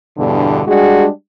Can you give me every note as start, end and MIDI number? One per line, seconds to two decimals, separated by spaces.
0.17 0.63 40
0.17 0.63 43
0.17 0.63 47
0.17 0.63 50
0.67 1.08 55
0.67 1.08 56
0.67 1.08 62
0.67 1.08 66
0.67 1.08 68